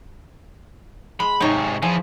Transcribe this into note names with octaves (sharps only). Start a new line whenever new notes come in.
G#3 B5
G#2 C3 D#4 C#5
E3 F3 G#4